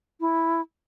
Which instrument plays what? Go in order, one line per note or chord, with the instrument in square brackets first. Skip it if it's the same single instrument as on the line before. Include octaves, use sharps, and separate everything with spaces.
[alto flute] E4